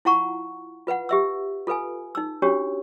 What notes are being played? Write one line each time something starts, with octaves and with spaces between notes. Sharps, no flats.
E4 F4 F5 F#5 A#5 C#6
F4 B4 F5 F#5
G4 E5 E6
F4 A4 B4 F5 G#5
D#4 E6
C#4 D4 F#4 G4 C#5